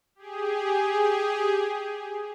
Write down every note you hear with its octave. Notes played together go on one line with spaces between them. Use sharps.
G4 G#4